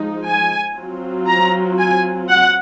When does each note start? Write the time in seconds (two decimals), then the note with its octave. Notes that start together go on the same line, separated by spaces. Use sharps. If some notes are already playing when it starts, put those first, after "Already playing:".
Already playing: F3 G#3 D#4
0.25 G#5
0.77 F#3 C4 F4
1.27 A#5
1.79 G#5
2.29 F#5